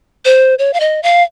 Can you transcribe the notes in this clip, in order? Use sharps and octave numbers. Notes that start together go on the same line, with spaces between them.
C5
C#5
F5
D#5
F5